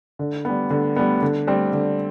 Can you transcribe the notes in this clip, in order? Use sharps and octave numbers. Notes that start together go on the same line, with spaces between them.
D3
G3 B3
D3
G3 B3
D3
G3 C4
D3